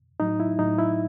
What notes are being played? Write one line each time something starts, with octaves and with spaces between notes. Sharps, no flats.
A2 F#3 D#4
E4
A2 F#3 D#4
E4